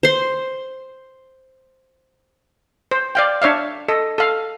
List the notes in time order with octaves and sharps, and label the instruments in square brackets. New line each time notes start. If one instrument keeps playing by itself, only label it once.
[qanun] C5 C6
[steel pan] C5
D5 F5 G5
D4 C#5 E5 F5
A4 D#5
A4 F5